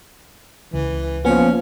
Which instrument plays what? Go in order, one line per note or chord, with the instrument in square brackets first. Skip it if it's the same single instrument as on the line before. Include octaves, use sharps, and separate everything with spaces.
[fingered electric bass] C#2 [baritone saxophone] E3
[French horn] F3 [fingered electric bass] A#3 [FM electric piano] B3 [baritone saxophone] C#4